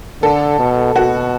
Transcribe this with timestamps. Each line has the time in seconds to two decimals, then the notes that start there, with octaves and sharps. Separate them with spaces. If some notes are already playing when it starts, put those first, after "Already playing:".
0.23 D3 A4
0.59 B2
0.95 B2 F#4